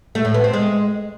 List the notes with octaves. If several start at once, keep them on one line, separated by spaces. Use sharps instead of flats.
A3
A2
B3
C4
G#3